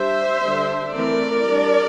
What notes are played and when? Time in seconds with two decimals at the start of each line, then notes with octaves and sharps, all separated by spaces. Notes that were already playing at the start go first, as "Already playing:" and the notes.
Already playing: G3 D4 C5 E5
0.41 D3 G3 D4
0.93 E3 A3 C4 A#4 D5
1.47 G3 D4